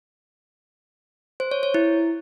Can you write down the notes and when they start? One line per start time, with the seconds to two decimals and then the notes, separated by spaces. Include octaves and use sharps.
1.40 C5
1.51 C#5
1.63 C#5
1.74 E4